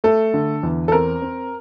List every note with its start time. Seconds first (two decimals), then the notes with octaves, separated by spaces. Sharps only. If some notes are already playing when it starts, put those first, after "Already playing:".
0.04 A3 A4
0.34 D3
0.63 E2
0.88 A4
0.92 C4 A#4
1.22 C4